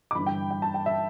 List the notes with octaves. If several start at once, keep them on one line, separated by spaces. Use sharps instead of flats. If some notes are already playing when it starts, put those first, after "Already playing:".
D6
G1 G2 E3 B5
G5
G5
A5
G5
E5